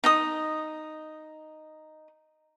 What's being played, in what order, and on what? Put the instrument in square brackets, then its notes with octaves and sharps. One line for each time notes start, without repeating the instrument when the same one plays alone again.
[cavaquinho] D#4 D#5 D#6